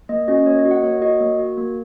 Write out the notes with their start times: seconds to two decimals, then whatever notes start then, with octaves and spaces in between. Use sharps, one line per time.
0.09 A#3 D#5
0.28 C#4 F#4 D#5
0.46 A#3 C#5
0.59 D#5
0.65 F#4
0.71 F#5
0.84 A#3 C#5
1.02 F#4 D#5
1.20 A#3
1.39 F#4
1.57 A#3